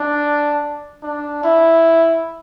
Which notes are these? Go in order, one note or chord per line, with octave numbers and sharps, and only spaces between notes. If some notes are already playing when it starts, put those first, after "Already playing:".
Already playing: D4
D4
E4